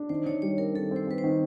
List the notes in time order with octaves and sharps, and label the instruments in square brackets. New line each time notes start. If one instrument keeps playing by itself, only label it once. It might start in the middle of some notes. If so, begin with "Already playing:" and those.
Already playing: [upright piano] D4
[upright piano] D#3 [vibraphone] C5
[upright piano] D#3 [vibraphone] C#5
[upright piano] G3 [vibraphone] C#5
[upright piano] C4 [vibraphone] A#4
[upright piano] D#3 [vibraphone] A4
[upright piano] C4
[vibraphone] C5
[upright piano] C4 [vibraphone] B4
[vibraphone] C5
[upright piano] D#3